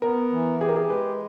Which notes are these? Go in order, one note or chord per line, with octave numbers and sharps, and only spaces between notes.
B3 A#4
E3
G4 G#4
A#4
G#4
G#3 B4